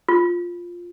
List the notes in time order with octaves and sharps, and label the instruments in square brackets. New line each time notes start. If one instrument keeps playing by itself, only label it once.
[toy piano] F4